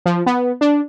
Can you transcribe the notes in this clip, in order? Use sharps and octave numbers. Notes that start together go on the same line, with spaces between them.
F3
B3
D4